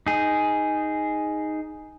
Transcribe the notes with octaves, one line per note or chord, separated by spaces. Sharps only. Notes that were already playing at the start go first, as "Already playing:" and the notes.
D#4 G#4